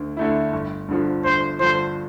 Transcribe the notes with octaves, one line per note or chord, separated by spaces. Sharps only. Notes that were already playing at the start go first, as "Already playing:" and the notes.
Already playing: D2 D3
D3 A3 E4
G1
G2 D3 F3
G1 C5
G2 D3 F3 C5